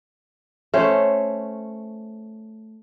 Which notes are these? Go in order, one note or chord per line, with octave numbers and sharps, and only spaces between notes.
A3 C#4 C5